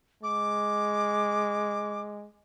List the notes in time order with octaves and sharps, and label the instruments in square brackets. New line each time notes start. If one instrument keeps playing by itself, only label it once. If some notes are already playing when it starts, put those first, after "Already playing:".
[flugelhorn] G#3 [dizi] D6